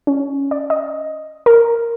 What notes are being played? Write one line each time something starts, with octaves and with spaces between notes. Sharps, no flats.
C#4
D5
D#5
A#4